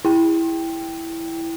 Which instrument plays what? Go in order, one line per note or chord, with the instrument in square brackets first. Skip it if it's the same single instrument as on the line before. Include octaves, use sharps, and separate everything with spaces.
[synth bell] E4 G5